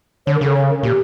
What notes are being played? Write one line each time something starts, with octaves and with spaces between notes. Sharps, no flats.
D3 C#5
A#4
C#3 A4
C#5
A#4
A#2 G4